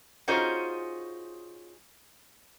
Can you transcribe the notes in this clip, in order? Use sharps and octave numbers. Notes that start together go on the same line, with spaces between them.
C#4 D#4 F4 F#4 G#4 C5